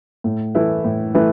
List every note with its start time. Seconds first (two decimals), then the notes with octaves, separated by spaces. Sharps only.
0.24 A2
0.55 E3 A3 E4 B4
0.85 A2
1.14 E3 A3 E4 B4